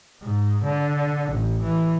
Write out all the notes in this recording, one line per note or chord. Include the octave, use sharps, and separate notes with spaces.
G#2
D3
A1
E3